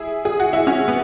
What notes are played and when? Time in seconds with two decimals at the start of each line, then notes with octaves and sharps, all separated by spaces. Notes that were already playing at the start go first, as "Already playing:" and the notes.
Already playing: E4 G#4
0.25 G#4
0.40 F#4
0.53 E4
0.67 C#4 F#4
0.88 B3